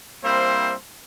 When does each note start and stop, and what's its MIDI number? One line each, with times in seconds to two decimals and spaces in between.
0.24 0.74 55
0.24 0.74 58
0.24 0.74 60
0.24 0.74 64
0.24 0.74 72